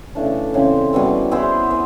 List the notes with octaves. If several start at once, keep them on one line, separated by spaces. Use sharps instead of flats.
C#3 E3 A3 D4
C#3 E3 G#3 C4
B2 G3 B3 E4
B3 E4 G#4 C5
B3